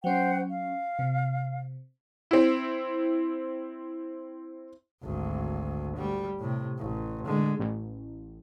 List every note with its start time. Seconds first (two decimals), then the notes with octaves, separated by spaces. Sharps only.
0.04 F#3 C#4 C5 F#5 G5
0.50 F5
0.99 C3
2.31 C4 E4
5.03 G#1 D2
5.97 G3
6.40 A2 C3
6.79 A1
7.25 D3 G#3
7.59 A1